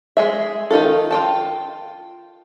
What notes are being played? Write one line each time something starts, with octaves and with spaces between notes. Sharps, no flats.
G#3 G#4 E5
D#3 D#4 F4 A4
F4 G5 A5